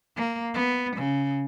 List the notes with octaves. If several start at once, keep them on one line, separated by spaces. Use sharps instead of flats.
A#3
B3
C#3